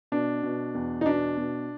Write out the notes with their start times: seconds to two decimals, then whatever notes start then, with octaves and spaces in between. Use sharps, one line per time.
0.12 B2 D4
0.43 B2
0.75 E2
1.01 D#4
1.06 B2 D4
1.37 B2